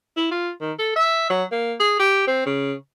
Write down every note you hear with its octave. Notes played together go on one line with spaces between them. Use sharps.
E4
F4
D#3
A4
E5
F#3
A#3
G#4
G4
C4
C#3